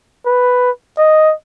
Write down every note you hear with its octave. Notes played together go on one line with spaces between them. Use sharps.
B4
D#5